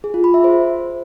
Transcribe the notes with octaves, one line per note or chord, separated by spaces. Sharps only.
G#4
F4
B5
E5
C5